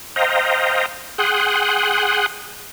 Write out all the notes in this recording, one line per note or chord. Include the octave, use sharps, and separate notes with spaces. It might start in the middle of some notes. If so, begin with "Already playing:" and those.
C5 D#5 F5 G5 A#5
G#4 F#5 G5 C6 D#6 F#6